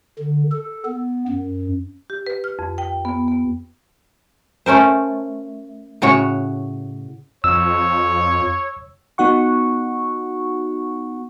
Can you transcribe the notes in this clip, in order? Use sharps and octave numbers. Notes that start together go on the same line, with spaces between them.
D3
A4
B3
F#2
G4
B4
F6
F2
G5
B3
B3
A3 C#4 A#4 C5
A2 C#3 F#4 C#5
F2 C#5 E6
B3 D#4 F#4 F#5 C#6